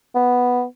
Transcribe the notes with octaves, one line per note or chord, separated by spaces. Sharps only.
B3